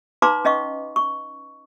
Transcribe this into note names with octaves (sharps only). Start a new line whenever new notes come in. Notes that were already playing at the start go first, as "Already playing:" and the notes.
D#4 B4 F5 A#5 C6 D6
C#4 D#5 F5 C#6
C#6